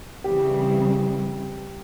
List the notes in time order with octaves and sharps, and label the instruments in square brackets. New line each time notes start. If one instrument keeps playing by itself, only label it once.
[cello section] C#3 E3 G3 C4 [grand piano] G4